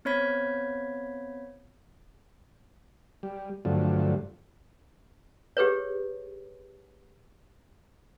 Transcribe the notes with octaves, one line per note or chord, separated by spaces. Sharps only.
B3 C4 C#5 B5 G#6 B6
G3
G2 D3 F3 F#3 A3
G4 G#4 B4 C#5